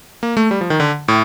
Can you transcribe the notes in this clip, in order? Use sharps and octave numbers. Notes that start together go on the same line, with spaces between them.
A#3
A3
G3
F3
D#3
D3
A2